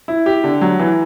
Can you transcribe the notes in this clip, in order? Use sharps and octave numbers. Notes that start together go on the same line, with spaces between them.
E4
G4
D3
F#3
E3